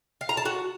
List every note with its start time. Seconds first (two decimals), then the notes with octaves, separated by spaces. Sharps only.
0.21 F5
0.29 A#5
0.37 A5
0.45 F#4